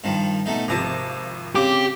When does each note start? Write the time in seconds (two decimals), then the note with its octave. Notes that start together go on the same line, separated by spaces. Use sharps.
0.04 G2 D#3 F3
0.46 B2 A3 D#4
0.68 G#1 C3 F3 A5 A#5
1.55 C#3 C4 G4 D6